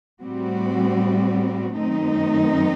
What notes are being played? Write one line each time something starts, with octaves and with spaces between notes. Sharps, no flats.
A2 G3 C4 F#4
F#2 D#3 A3 C4 D#4